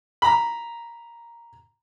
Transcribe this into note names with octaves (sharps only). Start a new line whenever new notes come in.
A#5 B5